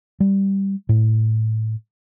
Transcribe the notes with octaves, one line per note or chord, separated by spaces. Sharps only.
G3
A2